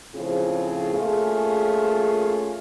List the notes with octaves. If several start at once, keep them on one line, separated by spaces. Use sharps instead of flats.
A2 C#3 F3 C4 F4 G#4
A3 A#3 C#4 F4 G#4